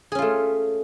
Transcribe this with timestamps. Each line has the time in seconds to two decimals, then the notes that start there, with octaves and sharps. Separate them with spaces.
0.12 G#4
0.15 C#4
0.18 F4
0.22 A3